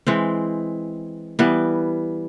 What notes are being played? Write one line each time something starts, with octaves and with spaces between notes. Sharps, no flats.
E3 G#3 C4
E3 G3 B3